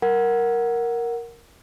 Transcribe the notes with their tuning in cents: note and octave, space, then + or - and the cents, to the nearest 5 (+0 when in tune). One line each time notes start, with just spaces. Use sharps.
A#4 +0 F#5 +0